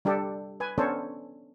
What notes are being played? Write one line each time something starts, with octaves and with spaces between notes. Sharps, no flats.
G3 D4 G4 A4
B4 G#5
B3 C#4 D4 A4 C5 C#5